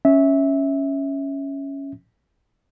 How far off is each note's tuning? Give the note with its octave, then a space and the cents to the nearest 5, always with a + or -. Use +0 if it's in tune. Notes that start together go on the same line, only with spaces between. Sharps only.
C#4 +0 E5 -15